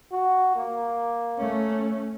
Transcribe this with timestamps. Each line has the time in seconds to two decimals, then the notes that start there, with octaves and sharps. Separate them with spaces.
0.12 F#4
0.56 A#3
1.38 A3 C#4